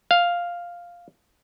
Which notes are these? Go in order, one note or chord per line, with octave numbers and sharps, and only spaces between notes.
F5